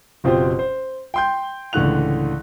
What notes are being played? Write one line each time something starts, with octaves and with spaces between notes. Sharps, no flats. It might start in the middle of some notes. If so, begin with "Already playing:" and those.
F#1 B2 C4 F4 G4 C5
C5
G5 C6 G6
C#2 A2 D3 E3 F#6 F7